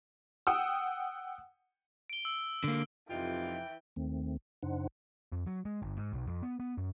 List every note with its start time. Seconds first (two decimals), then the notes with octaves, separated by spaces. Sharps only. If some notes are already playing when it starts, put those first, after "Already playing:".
0.47 F#5 G5 D#6 E6
2.10 D7 G7
2.25 E6
2.64 D3 A#3
3.10 F2 C3 E3 D#4 F4 G5
3.96 D#2 D#3 A3 C4
4.63 F#2 C#3 D4 D#4 C5 F#5
5.32 F2
5.47 F#3
5.65 G#3
5.82 G1
5.97 G#2
6.13 B1
6.27 F2
6.43 B3
6.60 B3
6.78 F#2